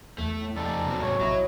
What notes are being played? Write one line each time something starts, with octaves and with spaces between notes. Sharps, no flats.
E2 A3
A2
F2 D#4 A4 D5
C3 F#3
G#2 C#5
A#1 F#3 E4 D#5